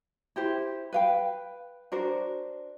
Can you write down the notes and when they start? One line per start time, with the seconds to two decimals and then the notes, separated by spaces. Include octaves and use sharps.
0.36 E4 G4 C5
0.93 B4 F5 G5
1.92 D4 F#4 A#4 C5